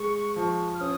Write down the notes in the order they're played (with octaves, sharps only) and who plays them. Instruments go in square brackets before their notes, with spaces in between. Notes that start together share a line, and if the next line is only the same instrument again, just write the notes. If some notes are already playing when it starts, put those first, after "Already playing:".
Already playing: [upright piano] G#3 [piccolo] C#6
[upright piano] F3
[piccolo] F6
[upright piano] C#4 [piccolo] D#6